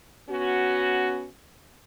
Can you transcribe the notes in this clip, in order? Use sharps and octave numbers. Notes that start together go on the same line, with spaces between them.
B3 C#4 F#4